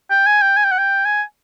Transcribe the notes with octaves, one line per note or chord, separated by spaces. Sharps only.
G5
G#5
G5
G#5
G5
F#5
G5
G#5